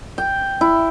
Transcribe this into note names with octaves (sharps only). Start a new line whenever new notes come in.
G5
E4